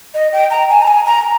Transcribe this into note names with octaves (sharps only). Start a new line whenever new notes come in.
D#5
G5
A#5
G#5
A#5
G#5
A#5